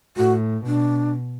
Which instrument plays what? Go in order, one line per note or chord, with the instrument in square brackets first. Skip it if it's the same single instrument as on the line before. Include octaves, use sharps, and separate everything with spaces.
[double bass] A2 [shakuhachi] F#4
[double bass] B2 [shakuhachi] D4